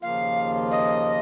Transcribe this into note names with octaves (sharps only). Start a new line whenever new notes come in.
D#2 C#3 F3 A#3 F4 F5
D#5